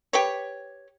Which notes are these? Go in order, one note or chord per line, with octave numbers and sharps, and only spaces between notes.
G4 B4 C#5